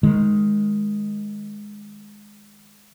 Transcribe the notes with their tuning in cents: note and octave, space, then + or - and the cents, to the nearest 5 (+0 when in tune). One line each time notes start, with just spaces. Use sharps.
D#3 +0 G#3 +0